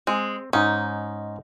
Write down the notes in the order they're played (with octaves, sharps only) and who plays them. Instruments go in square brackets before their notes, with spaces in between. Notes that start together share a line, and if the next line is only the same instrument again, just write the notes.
[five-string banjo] G#3 [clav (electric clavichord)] C4
[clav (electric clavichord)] G#2 C#4 [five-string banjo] D#4